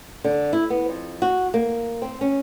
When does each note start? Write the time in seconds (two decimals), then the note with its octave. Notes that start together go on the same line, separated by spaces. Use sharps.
0.24 D3
0.53 E4
0.70 B3
0.89 F2
1.22 F#4
1.54 A#3
2.02 C4
2.21 C#4